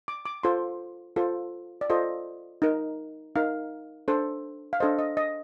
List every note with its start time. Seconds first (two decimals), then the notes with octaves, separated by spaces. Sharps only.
0.08 D6
0.25 D6
0.43 F4 A4 C5 C6
1.16 F4 A4 C5
1.81 D5
1.90 F4 A4 C5 D#5
2.62 D#4 A#4
3.36 D#4 A#4 F5
4.08 D4 A4 C5
4.73 F5
4.80 D4 A4 C5 D#5
4.99 D#5
5.17 D#5